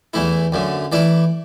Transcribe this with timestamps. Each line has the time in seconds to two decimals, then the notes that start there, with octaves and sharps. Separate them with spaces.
0.14 E2 E3 A3 E4
0.52 F#2 D3 A3
0.92 E3 A3 E4 D5